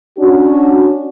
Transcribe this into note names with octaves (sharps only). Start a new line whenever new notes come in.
C#4 D4 F#4